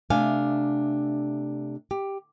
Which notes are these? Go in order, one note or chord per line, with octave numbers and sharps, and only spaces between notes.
C3 A3 D4 F5 G#5
G4